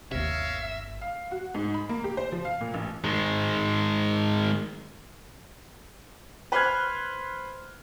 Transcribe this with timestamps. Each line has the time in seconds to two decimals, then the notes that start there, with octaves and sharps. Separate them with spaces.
0.12 G1 D#2 C3 A#3 A#4 C#5 E5 F5
1.02 F5
1.31 F#4
1.54 G#2
1.74 B5
1.89 A#3
2.04 G4
2.17 C5
2.32 F3
2.45 F5
2.61 A#2
2.74 A1
3.04 D#3 G#3
6.52 B4 C5 C6 F6 F#6 G#6